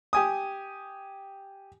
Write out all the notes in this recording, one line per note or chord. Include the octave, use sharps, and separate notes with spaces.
G4 G#5 D#6